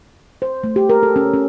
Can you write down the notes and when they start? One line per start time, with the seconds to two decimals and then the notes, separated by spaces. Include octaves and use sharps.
0.42 C5
0.64 A3
0.76 G4
0.89 A#4
1.03 A4
1.16 C#4
1.33 C#4